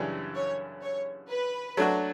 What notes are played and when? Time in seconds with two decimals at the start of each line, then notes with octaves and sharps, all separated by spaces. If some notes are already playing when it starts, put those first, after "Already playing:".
Already playing: F#2 C#3 E3 G3 D4
0.35 C#5
0.82 C#5
1.29 B4
1.77 F#3 A3 D4 F#4